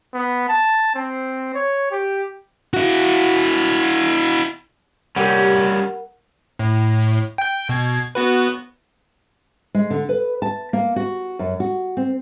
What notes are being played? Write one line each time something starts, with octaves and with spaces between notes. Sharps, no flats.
B3
A5
C4
C#5
G4
E4 F#4
C3 G3 C#4 G4 A#4 F#5 G5
A2
G5 G6
B2 G#6
B3 F#4 B4
G#3
D3
B4
A5
A#3
F#4
F#2
F#4
C4